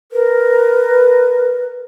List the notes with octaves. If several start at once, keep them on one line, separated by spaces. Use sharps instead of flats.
A#4 B4